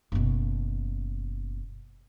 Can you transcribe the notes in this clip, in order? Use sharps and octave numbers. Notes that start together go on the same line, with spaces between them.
F#1 B2